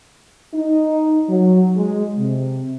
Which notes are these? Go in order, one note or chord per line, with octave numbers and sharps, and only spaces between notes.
D#4
F#3
G#3
C3